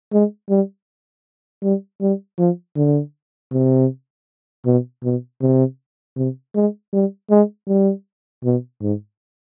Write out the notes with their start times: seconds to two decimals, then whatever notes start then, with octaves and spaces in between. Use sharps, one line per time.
0.13 G#3
0.49 G3
1.63 G3
2.01 G3
2.39 F3
2.76 D3
3.52 C3
4.66 B2
5.04 B2
5.42 C3
6.17 C3
6.55 G#3
6.93 G3
7.31 G#3
7.68 G3
8.44 B2
8.82 G#2